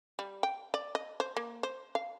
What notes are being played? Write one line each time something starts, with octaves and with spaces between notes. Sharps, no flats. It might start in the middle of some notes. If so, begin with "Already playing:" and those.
G3
G5
D5
D#5
C5
A#3
C5
F5